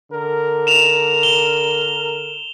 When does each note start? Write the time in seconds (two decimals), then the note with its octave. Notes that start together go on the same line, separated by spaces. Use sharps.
0.12 D3 A#4
0.67 E7 F7
1.23 G7